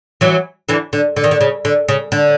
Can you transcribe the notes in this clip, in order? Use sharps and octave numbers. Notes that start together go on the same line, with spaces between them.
E3 F#3
D3 E3
D3
D3
D#3
D3
C#3
D3
C#3
D3